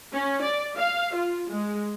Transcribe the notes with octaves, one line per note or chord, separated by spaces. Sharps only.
C#4
D5
F5
F4
G#3